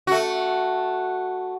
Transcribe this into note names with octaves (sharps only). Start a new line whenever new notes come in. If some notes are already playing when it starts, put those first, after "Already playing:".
A3 F#4